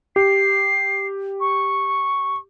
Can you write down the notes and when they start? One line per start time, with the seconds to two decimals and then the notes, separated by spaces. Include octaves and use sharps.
0.16 G4 C7
1.40 C#6